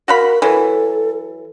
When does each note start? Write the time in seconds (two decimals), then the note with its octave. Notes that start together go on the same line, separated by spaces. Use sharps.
0.08 F#4 A#4 F5 B5
0.42 E3 F#3 A4